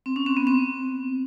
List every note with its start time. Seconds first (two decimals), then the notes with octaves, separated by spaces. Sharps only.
0.06 C4
0.16 C#4
0.26 C4
0.37 B3
0.47 C4